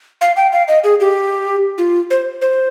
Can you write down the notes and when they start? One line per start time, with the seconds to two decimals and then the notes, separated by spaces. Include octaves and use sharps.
0.21 F5
0.37 G5
0.52 F5
0.68 D#5
0.84 G#4
1.00 G4
1.78 F4
2.10 C5
2.42 C5